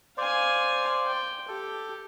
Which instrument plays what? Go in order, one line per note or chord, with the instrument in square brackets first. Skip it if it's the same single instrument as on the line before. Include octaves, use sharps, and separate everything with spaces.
[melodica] C5 D5 [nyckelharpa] F5 G#5
[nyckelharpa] G5
[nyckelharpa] G4 [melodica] A4